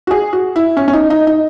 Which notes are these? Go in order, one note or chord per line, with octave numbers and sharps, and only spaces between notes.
F#4
G#4
F#4
E4
C#4
C#4
D#4
D#4
D#4